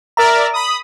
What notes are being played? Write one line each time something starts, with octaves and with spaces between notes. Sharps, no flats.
A#4 D5 E5 A#5
B5 D#6